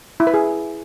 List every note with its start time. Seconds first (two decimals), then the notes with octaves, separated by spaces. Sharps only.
0.20 E4
0.27 B4
0.34 G#4